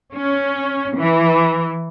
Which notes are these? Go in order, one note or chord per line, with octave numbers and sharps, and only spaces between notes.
C#4
E3